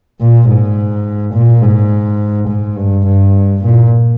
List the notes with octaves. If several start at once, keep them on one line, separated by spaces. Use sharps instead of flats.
A#2
G#2
A#2
G#2
G#2
G2
G2
A#2